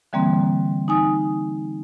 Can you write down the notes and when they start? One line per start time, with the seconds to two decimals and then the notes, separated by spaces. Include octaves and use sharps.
0.13 D3 E3 G3 A#3 C4
0.88 D#4 G#5 D#6